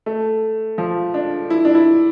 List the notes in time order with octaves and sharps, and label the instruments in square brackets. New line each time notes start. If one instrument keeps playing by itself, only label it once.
[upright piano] A3
F3
D4
E4
D4
E4